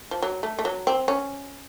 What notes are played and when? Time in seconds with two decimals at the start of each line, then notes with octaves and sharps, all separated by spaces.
0.11 F3
0.22 F#3
0.43 A3
0.59 A3
0.65 F#3
0.87 C4
1.08 C#4